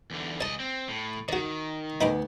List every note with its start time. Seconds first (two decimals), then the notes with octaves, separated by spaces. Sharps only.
0.11 E2 D3
0.41 C#2 D5 D#5 A5
0.60 C4
0.89 A2
1.29 D#3 F#4 D5
2.01 D2 B3 D#4 B5 D6